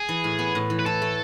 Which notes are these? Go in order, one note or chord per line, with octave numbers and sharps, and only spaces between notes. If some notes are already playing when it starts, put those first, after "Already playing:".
Already playing: G#4
E3
A2
B3
A2
E3
B4
E3 A4
A3